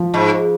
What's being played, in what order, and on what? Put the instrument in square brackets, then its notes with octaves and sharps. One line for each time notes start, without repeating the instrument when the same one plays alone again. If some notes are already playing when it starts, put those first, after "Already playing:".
Already playing: [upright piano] F3
[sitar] G#2